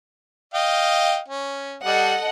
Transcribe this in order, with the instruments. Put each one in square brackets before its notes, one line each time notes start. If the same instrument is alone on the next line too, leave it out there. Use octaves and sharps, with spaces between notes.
[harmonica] D#5 F5 G5
C#4
[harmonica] G3 [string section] A4 D#5 F#5